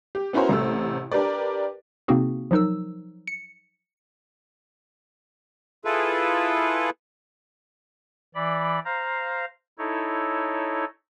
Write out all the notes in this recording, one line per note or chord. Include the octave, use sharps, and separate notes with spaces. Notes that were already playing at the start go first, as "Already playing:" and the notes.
G4
B3 C#4 E4 F#4 A#4 C5
A1 C3 A3 E6
D4 G4 A#4 B4 D5
C3 A#3 C4 D#4 F#4 G#4
F3 F#3 D#4 A#4 E6
C#7
E4 F4 G#4 A4 B4
E3 D5 B5
C5 F5 A#5
D#4 E4 A4 C#5